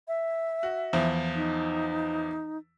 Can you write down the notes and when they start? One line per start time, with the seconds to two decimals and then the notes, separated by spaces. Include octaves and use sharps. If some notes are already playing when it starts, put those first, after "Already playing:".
0.08 E5
0.63 F#4
0.93 E2 F3 E4
1.36 D#4